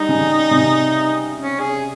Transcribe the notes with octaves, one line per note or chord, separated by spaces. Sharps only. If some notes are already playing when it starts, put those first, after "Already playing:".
Already playing: G3 D#4
C#3
C3
C#4
G#4